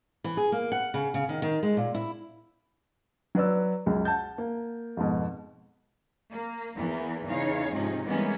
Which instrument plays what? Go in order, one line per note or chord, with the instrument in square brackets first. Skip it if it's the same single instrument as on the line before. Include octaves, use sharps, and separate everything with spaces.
[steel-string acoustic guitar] E3
G#4
A#3
F#5
C#3
C#3
D#3
D#3
G#3
A#2
E4
[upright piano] F#3 B4 D5 E6
C#2 F#2 C#3
F#5 A5 G6
A#3
F2 G#2 B2
[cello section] A#3
E2 E3 A#3 B3
E2 C#3 D#4 C#5 F5
G#2 C3 F3 C#4 D#4
E3 G3 G#3 A#3 B3 C#4